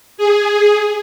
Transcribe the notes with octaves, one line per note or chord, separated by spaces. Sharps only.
G#4